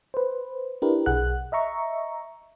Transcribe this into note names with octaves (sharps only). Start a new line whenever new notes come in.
B4 C5
D4 E4 G4 A#4 B4
B1 G#4 F#5 F#6
D#5 E5 A#5 C#6